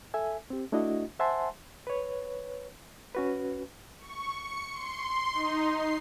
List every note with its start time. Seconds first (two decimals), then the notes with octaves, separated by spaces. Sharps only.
0.14 A4 E5 G#5
0.50 C4 G4
0.72 A3 D4 E4 F#4 D#5
1.19 C5 E5 F#5 G#5 A5 C6
1.87 B4 C#5
3.15 C#4 F#4 B4
3.99 C#6
4.34 C#7
4.71 C6
5.33 D#4
5.66 C7